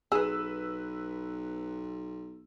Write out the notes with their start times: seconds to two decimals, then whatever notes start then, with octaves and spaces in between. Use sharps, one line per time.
0.12 B1 G#4 B4 E6